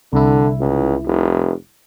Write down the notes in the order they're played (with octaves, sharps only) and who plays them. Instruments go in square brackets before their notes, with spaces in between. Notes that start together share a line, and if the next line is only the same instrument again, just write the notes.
[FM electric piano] C2 E4 [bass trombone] D3
[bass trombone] C#2
F1